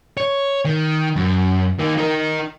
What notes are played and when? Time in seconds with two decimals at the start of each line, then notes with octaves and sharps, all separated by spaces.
0.17 C#5
0.65 D#3
1.16 F#2
1.80 D#3 A#3
1.98 D#4 A#4